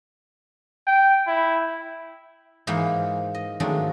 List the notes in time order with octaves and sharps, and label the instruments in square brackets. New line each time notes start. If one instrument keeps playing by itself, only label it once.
[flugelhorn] G5
E4
[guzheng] G#2 E3 G#3 A#3 C5 F#5
D#5
D#3 F3 F#3 G#3 A3 D4